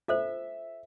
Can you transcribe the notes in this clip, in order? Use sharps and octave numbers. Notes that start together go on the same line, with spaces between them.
F4 A4 C5 E5